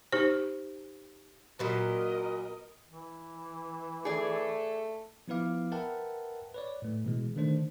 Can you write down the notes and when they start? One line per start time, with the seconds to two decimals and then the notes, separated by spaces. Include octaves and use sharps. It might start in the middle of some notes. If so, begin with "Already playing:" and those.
0.12 D#4 G4 C5
1.59 A#2 F#3 A#4 B4 D#5
2.90 E3
4.05 A3 G#4 D5
5.28 F3 B3 E4 B4 F5 D6
5.72 A#4 B4 E5 F#5 G5 A5
6.54 B4 C#5 D5
6.82 A2 A3
7.05 B2 E3 G#3
7.36 D3 D#3 A3 D4 C5